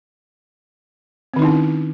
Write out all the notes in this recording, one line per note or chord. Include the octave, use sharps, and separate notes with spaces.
D#3 C4 C#4 D#4 E4